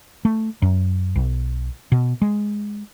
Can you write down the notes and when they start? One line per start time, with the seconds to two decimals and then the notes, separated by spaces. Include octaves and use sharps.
0.25 A3
0.62 F#2
1.16 B1
1.92 B2
2.22 G#3